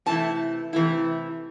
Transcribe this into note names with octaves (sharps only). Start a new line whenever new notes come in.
C3 E3 A3 E4 A5
C3 E3 A3 E4